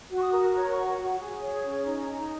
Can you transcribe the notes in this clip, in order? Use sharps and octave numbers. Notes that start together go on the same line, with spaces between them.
F#4
C#6
D#6
A#4
C#5 C#6
A#5
F#4 C#6
F#4
G#4
C#5
C#4
D#4 A#5
D#4